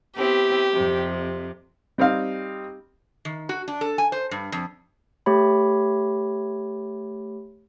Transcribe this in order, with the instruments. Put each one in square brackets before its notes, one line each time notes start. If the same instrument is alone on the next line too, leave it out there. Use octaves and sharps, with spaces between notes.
[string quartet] B3 C4 E4 [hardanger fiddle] G4
[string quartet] F2 C3
[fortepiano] G3 C4 D#4 F5
[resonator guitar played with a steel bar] D#3
F#4
D4
A4
G#5
C5
G2
F2
[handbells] A3 G4 C#5 B5